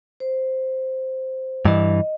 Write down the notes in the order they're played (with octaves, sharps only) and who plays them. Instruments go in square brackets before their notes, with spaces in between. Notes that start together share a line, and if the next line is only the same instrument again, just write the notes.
[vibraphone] C5
[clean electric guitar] G2 E3 [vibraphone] D#5